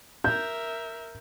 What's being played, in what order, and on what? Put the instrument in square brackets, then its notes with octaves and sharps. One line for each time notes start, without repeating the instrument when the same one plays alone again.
[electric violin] A#4 E5 [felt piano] G6